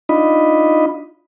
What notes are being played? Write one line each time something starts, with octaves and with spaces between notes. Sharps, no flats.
D4 D#4 F4 D#5 B5